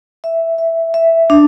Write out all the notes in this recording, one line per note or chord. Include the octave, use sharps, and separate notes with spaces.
E5
E5
E5
D4